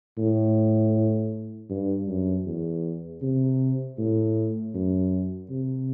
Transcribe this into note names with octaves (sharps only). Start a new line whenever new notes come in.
A2
G2
F#2
E2
C3
A2
F#2
C3